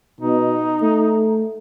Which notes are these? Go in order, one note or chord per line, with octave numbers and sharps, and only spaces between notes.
B2 D#4
A3